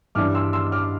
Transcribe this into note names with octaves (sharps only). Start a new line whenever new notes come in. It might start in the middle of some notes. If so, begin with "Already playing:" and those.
G2 E3 G3 D4 D6 F6
C6 E6
C6 E6
D6 F6